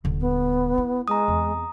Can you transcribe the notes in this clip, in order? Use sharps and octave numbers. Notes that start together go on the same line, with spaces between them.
D#1 D3
B3
E4
G#3 A#5 D#6
E2 C4